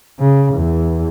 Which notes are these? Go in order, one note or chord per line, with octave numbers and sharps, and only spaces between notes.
C#3
E2